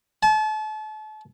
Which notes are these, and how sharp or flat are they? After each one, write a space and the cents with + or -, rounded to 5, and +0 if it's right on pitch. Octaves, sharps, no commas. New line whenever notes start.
A5 -35